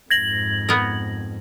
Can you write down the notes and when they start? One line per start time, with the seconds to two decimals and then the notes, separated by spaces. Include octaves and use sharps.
0.11 F2 G#2 G#6 A#6 F#7
0.69 B3 A#4